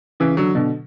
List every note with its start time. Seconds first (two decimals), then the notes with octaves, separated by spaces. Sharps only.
0.20 C#3 E3
0.37 D3 F#3
0.55 B2 D3